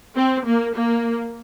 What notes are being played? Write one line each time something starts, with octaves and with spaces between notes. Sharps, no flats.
C4
A#3
A#3